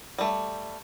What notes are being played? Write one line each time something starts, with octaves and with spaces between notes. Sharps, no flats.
G3 A3